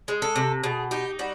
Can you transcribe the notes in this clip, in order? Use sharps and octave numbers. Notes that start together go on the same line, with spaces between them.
G#3
A4
C3
B2 G#4
D#4 G4
G3 F#4